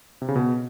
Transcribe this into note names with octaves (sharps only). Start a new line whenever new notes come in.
C3
C#3
B2